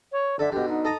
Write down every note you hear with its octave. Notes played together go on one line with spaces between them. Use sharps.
C#5
D3 A4 E5
B2 D3 G4
D#4
A4 D#5 A#5